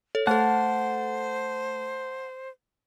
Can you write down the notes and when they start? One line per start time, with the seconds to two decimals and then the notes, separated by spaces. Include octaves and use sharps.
0.15 A4 C#5
0.27 A3 A4 C5 F#5 A5 F#6